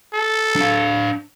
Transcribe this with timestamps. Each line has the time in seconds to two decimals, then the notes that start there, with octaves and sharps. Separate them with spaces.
0.14 A4
0.56 D4 F5